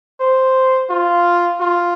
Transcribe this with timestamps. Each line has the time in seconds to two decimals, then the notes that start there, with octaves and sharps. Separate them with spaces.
0.20 C5
0.90 F4
1.60 F4